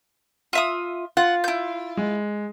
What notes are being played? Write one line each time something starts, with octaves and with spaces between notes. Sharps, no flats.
F4 E5 D#6
F4 F#5
E4 G6
G#3